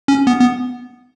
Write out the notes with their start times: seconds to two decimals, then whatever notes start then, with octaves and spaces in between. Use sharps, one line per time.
0.08 C#4
0.27 B3
0.40 B3